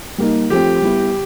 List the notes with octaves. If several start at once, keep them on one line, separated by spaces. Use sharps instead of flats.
G3 A#3 D#4
F3 A3 C4 G4
G3 B3 E4